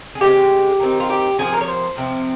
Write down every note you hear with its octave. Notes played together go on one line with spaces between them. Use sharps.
G#4
C#3 G#3 C4 G4
D#3 G#3 C4 D#4
F4
G4
C3 F3 A#3 F4 G#4
A#4
C#5
C5
C3 F3 C4